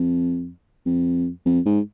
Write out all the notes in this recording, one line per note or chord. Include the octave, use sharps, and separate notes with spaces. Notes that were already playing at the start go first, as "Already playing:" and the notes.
Already playing: F2
F2
F2
G#2